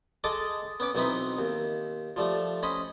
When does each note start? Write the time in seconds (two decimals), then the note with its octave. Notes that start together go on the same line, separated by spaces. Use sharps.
0.24 G#3 A4 D#5 A5 D6
0.80 B3 C#4 D6
0.95 B1 E3 B3 C4 D#4 B5
1.38 D#2
2.16 F3 G3 A3
2.63 C#4 C5 D#5 B5